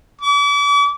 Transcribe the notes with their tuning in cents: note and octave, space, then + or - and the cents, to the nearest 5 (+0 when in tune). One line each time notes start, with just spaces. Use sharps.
D6 -40